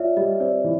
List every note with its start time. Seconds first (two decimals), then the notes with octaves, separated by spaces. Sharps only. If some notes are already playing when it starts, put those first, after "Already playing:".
Already playing: F4 C#5 D5 E5
0.17 G3 D#5
0.40 C4 D5
0.64 E3